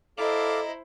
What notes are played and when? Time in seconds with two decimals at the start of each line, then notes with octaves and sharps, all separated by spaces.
0.18 E4 A4 C5 D5 D#5 F5 A#5 D6